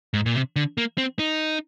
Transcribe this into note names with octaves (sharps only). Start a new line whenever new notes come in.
G#2
A#2
C3
D3
A#3
C4
D#4